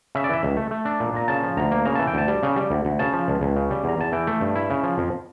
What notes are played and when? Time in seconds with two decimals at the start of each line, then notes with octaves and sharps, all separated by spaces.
0.15 C#3 E5
0.24 D5
0.29 E3 E5
0.43 C#2
0.57 A3
0.71 A3
0.85 D4
1.00 A#2
1.14 A#2 A#5
1.28 C#3 A5
1.43 F3
1.57 D2 A#5
1.71 A#3
1.85 C#3 A#5
1.95 E3 A5
2.07 G5
2.13 D2 A5
2.28 G3
2.43 C#3
2.56 G3
2.70 D2
2.85 D2
2.99 C#3 A5
3.13 F3
3.28 C#2
3.41 C#2
3.56 C#3
3.71 G3
3.84 E2 A#5
3.99 E2 A5
4.12 E3 G5
4.27 A3
4.41 G2
4.55 E4
4.70 C#3
4.83 F3
4.98 F2